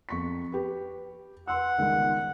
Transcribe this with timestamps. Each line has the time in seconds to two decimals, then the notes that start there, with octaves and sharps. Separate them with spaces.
0.09 F2 C#6 B6
0.52 G4 B4
1.48 B4 F#5 C6 E6
1.78 G1 C#2 D#3